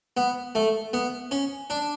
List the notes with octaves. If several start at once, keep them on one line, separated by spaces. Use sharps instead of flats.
B3
A3
B3
C#4
D4